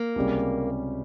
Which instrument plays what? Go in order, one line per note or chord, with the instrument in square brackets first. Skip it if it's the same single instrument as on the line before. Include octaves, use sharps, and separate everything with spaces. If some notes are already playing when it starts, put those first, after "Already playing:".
Already playing: [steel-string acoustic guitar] A#3
[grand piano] C#2 C3 G3 C#4 G4